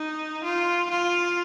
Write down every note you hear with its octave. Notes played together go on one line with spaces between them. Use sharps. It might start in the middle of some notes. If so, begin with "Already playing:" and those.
Already playing: D#4
F4
F4